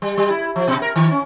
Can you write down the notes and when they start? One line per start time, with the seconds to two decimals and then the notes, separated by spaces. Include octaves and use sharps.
0.02 G3
0.18 G3
0.30 E4
0.56 F3
0.68 B2
0.82 A#4
0.96 D#3
1.11 C#4